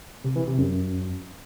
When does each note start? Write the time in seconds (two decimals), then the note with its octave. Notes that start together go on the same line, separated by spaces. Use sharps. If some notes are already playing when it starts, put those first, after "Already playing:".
0.24 C3
0.36 E3
0.47 C3
0.58 F#2